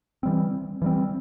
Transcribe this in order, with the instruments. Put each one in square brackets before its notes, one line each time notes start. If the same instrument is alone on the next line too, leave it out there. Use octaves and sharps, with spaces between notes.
[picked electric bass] E3 G3 C4
E3 G3 C4